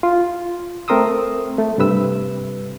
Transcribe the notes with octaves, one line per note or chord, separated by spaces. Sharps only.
F4
A3 C4 A#4 C6 D#6 E6
A3
G2 C3 B4 E6